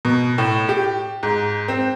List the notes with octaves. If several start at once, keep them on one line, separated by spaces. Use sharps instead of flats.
B2
A2
G4
G#2
C4